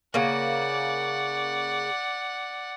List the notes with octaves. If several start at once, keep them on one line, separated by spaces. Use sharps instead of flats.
C#3 A#3 D5 F#5